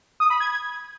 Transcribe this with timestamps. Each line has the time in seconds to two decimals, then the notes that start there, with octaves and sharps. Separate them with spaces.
0.20 D#6
0.30 B5
0.40 G#6